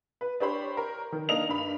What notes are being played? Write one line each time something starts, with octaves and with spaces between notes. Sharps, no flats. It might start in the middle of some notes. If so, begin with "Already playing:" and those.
B4
D4 G4 C5 C#5 B5
A#4
D#3
A#3 D4 D#4 D#5 F7
G2 B5